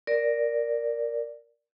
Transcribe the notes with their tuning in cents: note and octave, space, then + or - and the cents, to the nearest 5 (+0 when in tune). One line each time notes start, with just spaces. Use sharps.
A#4 +0 D5 +0